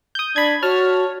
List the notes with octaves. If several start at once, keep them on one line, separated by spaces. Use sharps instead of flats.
D#6 G6
D4 B5 G#6
F#4 C#5 A5 F6